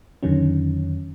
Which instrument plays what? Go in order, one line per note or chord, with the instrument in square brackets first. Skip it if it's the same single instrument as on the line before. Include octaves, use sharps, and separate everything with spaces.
[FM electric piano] F2 D3 D#3 F#3 C#4